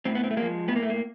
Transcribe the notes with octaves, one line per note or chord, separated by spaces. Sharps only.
A2 C4
B3
C4
A3
G#3 A#3
F3
A2 B3
A#3
A3
A#3